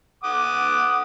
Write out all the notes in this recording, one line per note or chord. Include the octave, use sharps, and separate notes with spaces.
F#5 D6 D#6